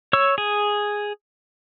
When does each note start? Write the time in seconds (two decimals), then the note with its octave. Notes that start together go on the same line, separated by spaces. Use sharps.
0.13 C#5 C#6 E6
0.38 G#4